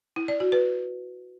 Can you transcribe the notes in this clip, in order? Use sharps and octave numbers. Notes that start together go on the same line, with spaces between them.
E4
D5
F#4
B4